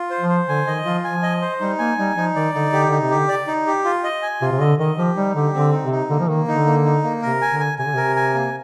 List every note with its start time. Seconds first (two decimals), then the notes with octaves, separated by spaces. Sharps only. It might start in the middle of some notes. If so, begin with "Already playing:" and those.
Already playing: F4
0.10 C5
0.20 F3
0.29 C5
0.48 D3 G#5
0.67 D#3 D#5
0.85 F3 F4
1.04 F3 G#5
1.23 D#5
1.42 C5
1.60 G3 D#4
1.79 A#3 G#5
1.98 G3 D#4
2.16 F3 D#4
2.35 D#3 D5
2.54 D3 D#4
2.73 D3 G4
2.87 D3 D#4
3.01 C3
3.10 D3 G4
3.29 D5
3.47 D#4
3.67 G4
3.85 F4
4.04 D#5
4.22 G#5
4.41 C3 F4
4.52 C3
4.60 D3 D#5
4.79 D#3 D#5
4.98 F3 G4
5.16 G3 D#4
5.35 D3 G4
5.54 D3 C4
5.72 D#4
5.82 C3
5.91 D#4
6.10 D3 A#3
6.20 F3
6.28 D#3 A#3
6.48 D3 D#4
6.66 A#3
6.85 D#4
7.04 A#3
7.22 C3 A#4
7.41 G#5
7.50 D3
7.60 G#5
7.78 C3 G#5
7.86 D3
7.93 C3 A#4
8.16 G#5
8.34 A#3